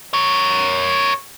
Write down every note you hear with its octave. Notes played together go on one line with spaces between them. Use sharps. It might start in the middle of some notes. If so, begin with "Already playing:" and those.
A#4 C#5